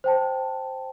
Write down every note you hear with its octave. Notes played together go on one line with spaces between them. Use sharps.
C5 G5 A5